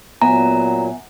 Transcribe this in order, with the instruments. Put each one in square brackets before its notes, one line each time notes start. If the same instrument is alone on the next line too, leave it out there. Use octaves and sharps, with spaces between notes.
[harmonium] A#2 F#3 [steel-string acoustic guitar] B3 E5 G#5 [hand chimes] A#5